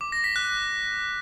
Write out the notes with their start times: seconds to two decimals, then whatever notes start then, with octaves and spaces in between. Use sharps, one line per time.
0.01 D6
0.12 A#6
0.24 B6
0.36 F#6